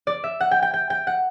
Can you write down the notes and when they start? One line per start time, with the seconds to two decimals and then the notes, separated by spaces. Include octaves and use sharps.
0.07 D5
0.24 E5
0.40 F#5
0.51 G5
0.62 G5
0.74 G5
0.90 G5
1.07 F#5